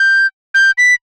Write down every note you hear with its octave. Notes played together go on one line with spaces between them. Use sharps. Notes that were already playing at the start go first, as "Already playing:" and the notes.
Already playing: G6
G6
B6